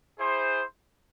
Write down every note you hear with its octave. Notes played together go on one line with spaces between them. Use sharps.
E4 G#4 C5